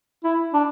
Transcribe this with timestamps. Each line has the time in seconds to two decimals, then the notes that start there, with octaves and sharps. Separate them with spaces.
0.24 E4
0.53 D4